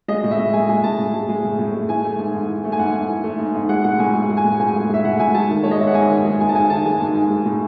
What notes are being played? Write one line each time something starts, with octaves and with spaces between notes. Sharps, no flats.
G#3 D#5
A2
E5
A2
G#3 G#5
G#3 G#5
A2 A5
A2
G#3
G#3
A2
A2
G#3
E3 G#5
A3
G#2
G#2
E3
A3
G#5
G#2 F#5
G#2
E3
A3
G#2
G#2
G#3 F#5
A2 F#5
A2 G#5
G#3
G#3
G#5
A2
A2 G#5
G#3
G#3 E5
A2 F#5
A2 G#5
G#3 A5
D#3
G#3 C#5
D#5
G#2 E5
F#5
G#2 G#5
D#3
G#3
G#2 G#5
A5
G#2 G#5
D#3 A5
G#3 G#5
G#2
G#2
G#3
A2